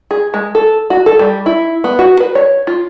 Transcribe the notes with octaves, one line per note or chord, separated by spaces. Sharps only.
G#4
G#3
A4
F#4
A4
G3
E4
B3
F#4
B4
C#5
F4